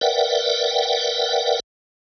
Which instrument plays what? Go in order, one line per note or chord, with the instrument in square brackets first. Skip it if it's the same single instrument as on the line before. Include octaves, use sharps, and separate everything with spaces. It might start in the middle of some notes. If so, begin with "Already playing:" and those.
[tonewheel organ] A#4 B4 D5 E5 F#5 G5